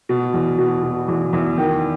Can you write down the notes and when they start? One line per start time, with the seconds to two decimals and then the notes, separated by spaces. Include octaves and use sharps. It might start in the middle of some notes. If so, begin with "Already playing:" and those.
0.09 B2
0.34 E2
0.58 B2
0.83 B2
1.08 E2
1.33 E2
1.58 D#3